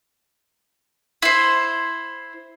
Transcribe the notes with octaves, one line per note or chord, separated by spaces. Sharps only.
E4 C5